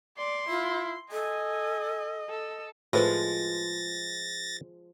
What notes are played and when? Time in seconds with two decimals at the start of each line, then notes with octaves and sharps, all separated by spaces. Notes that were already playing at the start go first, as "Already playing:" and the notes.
0.18 D5 C6
0.49 E4 F4
1.12 A4 D#5 G#5
2.29 A4
2.93 A2 F3 G#3 F#4 B4 C5 A6 A#6